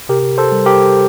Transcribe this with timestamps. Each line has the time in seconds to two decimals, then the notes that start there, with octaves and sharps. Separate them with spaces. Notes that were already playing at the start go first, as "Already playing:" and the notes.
0.09 C3 G4 A#4
0.38 A4 C5
0.52 G3
0.66 G4 A#4